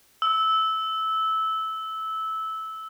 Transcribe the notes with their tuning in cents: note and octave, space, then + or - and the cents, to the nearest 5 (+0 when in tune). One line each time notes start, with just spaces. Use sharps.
E6 -15